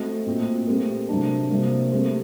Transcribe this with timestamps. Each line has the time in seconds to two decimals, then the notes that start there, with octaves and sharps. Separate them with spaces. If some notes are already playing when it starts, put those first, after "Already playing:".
Already playing: A3 C4 F#4 A4 D#5
0.27 A#2 A3 C4 F#4
0.68 A3 C4 G4 A#4
1.09 C3 F#3 A3 D4
1.51 C3 F#3 A#3
1.91 A3 C4 G4 C5